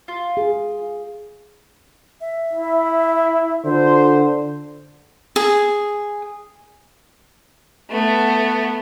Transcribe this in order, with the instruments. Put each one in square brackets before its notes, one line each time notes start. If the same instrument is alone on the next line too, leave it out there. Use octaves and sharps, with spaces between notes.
[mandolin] F4
[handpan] G#4
[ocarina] E5
[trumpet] E4
[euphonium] D3 [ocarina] F4 [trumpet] C5
[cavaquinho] G#4
[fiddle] A3 B3